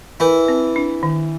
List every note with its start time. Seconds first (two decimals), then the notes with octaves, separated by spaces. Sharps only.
0.20 E3 E4 A#4
0.48 C4
0.76 D4
1.03 D#3